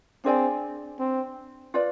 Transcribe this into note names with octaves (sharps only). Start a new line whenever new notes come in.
C4 D4 G#4 D5 G#5
C4
F4 B4 D5